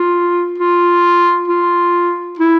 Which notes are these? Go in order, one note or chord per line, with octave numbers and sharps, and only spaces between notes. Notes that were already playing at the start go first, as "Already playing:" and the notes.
Already playing: F4
F4
F4
E4